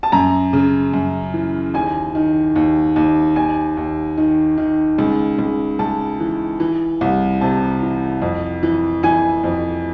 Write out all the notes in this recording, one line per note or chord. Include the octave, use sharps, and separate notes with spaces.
A5
F#2 A#5
C#3
F#2
E3
D#2 G#5
D#3
D#2
D#2
D#2 G#5
D#2
D#3
D#3
C#2
C#2
C#2 A5
E3
E3
C2
C3 A5
E3
F2
E3
E3 G#5
F2